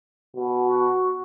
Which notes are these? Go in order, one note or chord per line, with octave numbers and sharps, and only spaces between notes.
B2
F#4